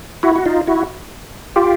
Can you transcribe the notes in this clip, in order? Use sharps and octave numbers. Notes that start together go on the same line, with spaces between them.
E4 F#4
F#4
D#4 F4
E4 F#4
F4 G4